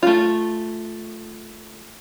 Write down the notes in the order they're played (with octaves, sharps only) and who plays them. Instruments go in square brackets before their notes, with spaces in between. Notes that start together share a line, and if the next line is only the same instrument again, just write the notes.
[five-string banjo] A3 F4